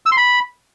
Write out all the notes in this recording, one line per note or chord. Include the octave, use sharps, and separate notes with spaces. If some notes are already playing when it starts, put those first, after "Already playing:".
E6
C6
B5